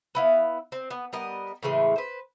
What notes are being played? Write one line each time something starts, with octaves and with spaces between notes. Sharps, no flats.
B3 E4 F5
C4
B3
G3 B3 A#4 D#5
A2 C#3 E3 G#3
B4 C5